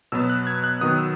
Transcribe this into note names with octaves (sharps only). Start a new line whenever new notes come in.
B2 F#3 B3 E6
F#6
G#6
F#6
D#3 F#3 B3 D#6
E6